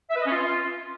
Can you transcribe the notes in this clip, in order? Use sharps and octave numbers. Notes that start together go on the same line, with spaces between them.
E5
B4
D#5
C#4
F4